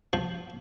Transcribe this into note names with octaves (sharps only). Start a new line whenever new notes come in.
F3